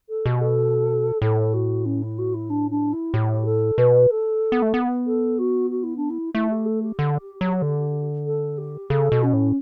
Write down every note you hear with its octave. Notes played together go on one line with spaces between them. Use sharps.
A4
B2 G4
A4
A2 A4
F#4
C#4
E4
F#4
E4
D4
D4
E4
A2 G4
A4
B2 B4
A4
B3
A3
B3
A4
F#4
F#4
E4
D4
E4
A3 E4
G4
A4
G4
D3
F#3
D3
A4
G4
C#3 A4
B2
C#4
A2